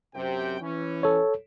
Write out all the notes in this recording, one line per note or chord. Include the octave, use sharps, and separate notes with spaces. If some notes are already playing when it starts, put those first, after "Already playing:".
F#2 C3 G5
E3 C#4
A4 C#5